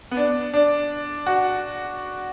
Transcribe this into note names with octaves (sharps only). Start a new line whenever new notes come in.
B3
D4
D4
F#4